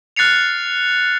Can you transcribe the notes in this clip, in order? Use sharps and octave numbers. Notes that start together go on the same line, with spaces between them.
F6 F#6 A6 C7 C#7 F7